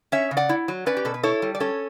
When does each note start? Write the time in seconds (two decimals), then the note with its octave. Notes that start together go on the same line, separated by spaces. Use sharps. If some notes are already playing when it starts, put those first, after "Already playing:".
0.12 C#4 C#5 E5
0.31 C#3
0.37 D5 F#5
0.49 E4
0.68 F#3
0.86 C#4 B4 D5
0.97 G4
1.05 B2 A4
1.14 B4
1.23 E4 A4 C#5
1.42 G3
1.55 D5
1.60 C#4 A4 C#5